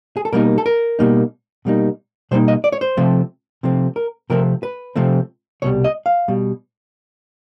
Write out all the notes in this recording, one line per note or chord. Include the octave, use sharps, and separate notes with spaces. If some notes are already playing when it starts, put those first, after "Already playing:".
G#4
A4
B2 G3 A#3 D#4 A#4
A4
A#4
B2 G3 A#3 D#4
B2 G3 A#3 D#4
B2 G3 A#3 D#4 C5
D#5
D5
C#5
C5
C3 F3 A3 C4
C3 F3 A3 C4
A#4
C3 F3 A3 C4 A#4
B4
C3 F3 A3 C4
C2 B2 G3 C#5
D#5
F5
B2 G3